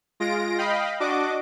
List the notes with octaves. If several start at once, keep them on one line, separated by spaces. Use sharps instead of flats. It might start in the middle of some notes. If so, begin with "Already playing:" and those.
G#3 F4 A#6 D7
D#5 F5 G5 B5
D4 F#4 D#5 D6